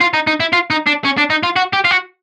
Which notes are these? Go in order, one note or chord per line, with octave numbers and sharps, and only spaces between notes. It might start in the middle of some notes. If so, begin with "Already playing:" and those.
F4
D#4
D#4
E4
F4
D#4
D4
C#4
D4
D#4
F4
F#4
G4
F4
F#4